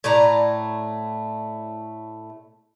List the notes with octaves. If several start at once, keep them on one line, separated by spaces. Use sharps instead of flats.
A2 A3 D5 A#5